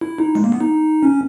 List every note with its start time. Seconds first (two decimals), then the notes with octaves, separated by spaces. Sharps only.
0.01 E4
0.19 D#4
0.35 G#3
0.44 A#3
0.52 B3
0.61 D#4
1.03 C#4